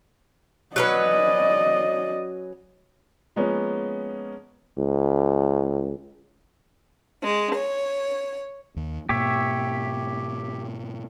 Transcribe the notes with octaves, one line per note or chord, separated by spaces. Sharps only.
F#3 C#4 B4 D5 D#5
F3 G#3 A#3 B3 C#4
C#2
G#3
C#5
D#2
G#2 B2 A#3 G4 C#5 E5